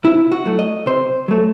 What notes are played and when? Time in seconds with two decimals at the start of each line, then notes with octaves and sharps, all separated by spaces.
0.04 C3 E4
0.32 F#4
0.46 F#3 A3
0.59 D#5
0.86 C3 C5
1.28 F#3 A3